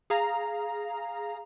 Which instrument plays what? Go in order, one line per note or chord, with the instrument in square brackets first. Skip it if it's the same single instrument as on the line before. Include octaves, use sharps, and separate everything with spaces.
[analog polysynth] G#4 F5 A#5